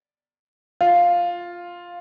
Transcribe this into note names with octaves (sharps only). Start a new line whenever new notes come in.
F4